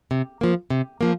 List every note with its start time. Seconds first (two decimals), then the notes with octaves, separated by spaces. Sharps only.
0.11 C3
0.41 F3 A#3
0.70 C3
1.01 F3 A#3